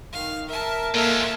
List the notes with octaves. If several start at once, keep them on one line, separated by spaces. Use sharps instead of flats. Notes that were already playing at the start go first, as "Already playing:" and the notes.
D#3 F5
A#4 E5 A5
A#2 G#3 A#3 A4 E5 A5 F6